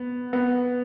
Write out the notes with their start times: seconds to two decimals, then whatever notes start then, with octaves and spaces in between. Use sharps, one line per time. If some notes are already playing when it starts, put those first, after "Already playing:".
Already playing: B3
0.33 B3